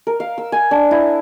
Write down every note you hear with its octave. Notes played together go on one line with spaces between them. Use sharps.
A#4
F5
E6
G#5
D4
E4